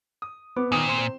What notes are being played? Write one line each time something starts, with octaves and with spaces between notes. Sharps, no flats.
D#6
B3 D6
A#2 D#3 B3 D#6
C4 C6 E7
C5